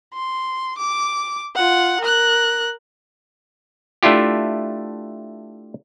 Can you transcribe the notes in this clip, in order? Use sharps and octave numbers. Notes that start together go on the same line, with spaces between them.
C6
D6
F4 F#5
A#4 F#6
A3 D4 E4 F4 G4